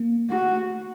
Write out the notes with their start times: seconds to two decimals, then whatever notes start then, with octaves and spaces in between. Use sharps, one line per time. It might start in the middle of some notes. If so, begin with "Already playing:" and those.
Already playing: A#3
0.30 A3 F#4